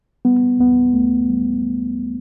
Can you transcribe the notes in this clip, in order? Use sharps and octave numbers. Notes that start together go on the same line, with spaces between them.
G3 B3
D2 B3
D2 A3
G3